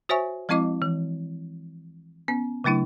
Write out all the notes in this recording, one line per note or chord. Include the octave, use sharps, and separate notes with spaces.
F#4 C5 C#5 E5 G#5 C#6
F3 G#3 C4 E4 D#5 D6
E3
B3 C#4
C#3 F#3 A3 D4 E4